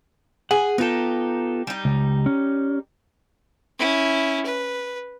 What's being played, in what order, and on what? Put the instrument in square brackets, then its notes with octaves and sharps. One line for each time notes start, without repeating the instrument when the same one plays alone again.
[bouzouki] G#4 [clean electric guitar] F#5
[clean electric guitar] B3 F4 A4 [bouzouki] D#4 G4
[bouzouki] G3 D#4
[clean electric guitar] C#2
C#4
[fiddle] C#4 E4
B4